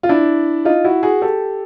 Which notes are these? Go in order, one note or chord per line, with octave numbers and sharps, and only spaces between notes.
F4
D4 E4
D#4 F4
E4 F#4
F#4 G#4
G4 A4